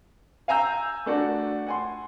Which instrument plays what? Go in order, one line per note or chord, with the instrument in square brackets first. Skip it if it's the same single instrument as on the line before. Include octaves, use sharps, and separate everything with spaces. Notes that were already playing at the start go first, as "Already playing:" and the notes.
[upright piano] F5 G#5 A#5 E6 G6
A3 D4 F#4
F#5 G#5 C6